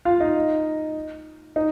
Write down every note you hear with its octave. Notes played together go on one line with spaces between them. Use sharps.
F4 F5
D#4 D#5
D#4 D#5